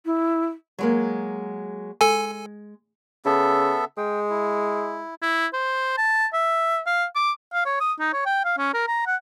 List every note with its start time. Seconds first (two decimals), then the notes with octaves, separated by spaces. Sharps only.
0.06 E4
0.78 F#3 G#3 A#3
2.01 G#3 A4 G#5
3.25 C#3 B3 A4 E5
3.97 G#3 G5
4.30 E4
5.22 E4
5.53 C5
5.97 A5
6.33 E5
6.86 F5
7.15 D6
7.53 F5
7.66 C#5
7.80 D#6
7.99 D#4
8.13 C#5
8.26 G5
8.45 F5
8.58 C#4
8.74 A#4
8.87 A#5
9.07 F#5